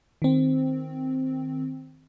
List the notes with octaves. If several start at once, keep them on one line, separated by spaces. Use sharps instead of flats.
D#3 C4